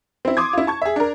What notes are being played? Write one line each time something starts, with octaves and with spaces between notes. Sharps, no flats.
C4 E4
C6 D6 D#6 G#6
E4 F4
A5 C#6 G#6
G#4 E5
D4 A#4